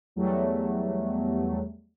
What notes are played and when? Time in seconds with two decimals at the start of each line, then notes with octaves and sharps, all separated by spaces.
0.16 E2 F#3 G3 A3